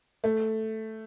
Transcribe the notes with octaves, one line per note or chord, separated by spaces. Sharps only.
A3